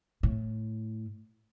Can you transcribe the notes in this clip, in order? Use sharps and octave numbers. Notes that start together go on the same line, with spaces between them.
A2